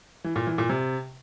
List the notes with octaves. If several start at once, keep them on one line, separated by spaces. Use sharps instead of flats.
E3
A#2
E3
A#2
C3